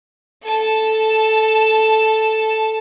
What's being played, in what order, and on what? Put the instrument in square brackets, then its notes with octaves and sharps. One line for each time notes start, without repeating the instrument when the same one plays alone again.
[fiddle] A4 A5